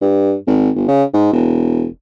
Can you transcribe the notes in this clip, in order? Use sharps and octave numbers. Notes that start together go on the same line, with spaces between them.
G2
G#1
G1
C#3
G#2
E1